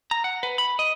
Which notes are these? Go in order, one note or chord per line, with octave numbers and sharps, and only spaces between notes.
A#5
F#5
B4
B5
D#5